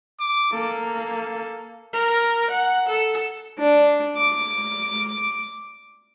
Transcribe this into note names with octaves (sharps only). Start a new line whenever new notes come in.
D6
A#3 A4
A#4
F#5
A4
D4
D6